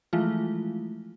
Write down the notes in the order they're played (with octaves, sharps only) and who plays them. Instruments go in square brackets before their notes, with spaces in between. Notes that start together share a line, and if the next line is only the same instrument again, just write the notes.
[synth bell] E3 F3 G#3 A3 E4 F4